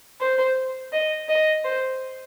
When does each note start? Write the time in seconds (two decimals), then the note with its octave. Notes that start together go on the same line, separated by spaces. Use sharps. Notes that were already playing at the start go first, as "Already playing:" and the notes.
0.21 C5
0.93 D#5
1.29 D#5
1.65 C5